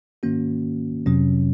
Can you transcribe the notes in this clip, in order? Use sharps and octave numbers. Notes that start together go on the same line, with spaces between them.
G#2 D#3 A#3 C#4 F#4
F2 C3 F#3 C#4